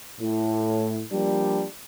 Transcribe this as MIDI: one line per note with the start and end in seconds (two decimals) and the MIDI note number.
0.21 1.01 45
1.13 1.65 53
1.13 1.65 55
1.13 1.65 58
1.13 1.65 62